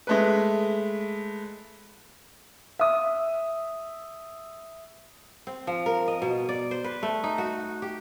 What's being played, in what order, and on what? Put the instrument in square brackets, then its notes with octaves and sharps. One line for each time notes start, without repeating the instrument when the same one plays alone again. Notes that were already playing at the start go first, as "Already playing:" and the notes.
[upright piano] G#3 A3 B4
[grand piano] E5 D#6
[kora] C4
F3
A#4
D#5
B2
D5
C5
B4
A3
D#4
F#4
G4